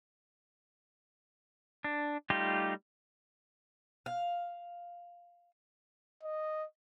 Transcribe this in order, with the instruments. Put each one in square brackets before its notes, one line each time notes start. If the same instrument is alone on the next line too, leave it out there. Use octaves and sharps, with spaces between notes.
[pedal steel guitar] D4
G3 A3 D#4 F4 G4
[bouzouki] F5
[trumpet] D#5